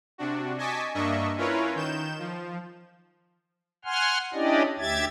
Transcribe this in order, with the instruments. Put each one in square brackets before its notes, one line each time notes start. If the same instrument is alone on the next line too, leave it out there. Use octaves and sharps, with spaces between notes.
[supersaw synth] C3 D4 F#4
D#5 G#5 A5 C#6 D6 B6
G2 A#3 D4 D#5 E5 C#6
C#4 E4 F4 A#4 B4 C#5
D#3 G6 E7
F3
[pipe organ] F#5 G#5 C6 F6
C#4 D4 E4 G4 D5 D#5
D2 G4 E5 G#6 A6